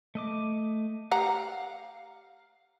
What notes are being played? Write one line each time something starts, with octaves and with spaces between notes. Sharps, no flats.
A3 D#5 D6
G4 F5 F#5 A#5